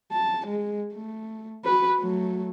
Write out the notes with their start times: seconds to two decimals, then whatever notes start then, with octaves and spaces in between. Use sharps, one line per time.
0.12 A5
0.47 G#3
0.94 A3
1.65 F#4 B4
2.00 F#3 A3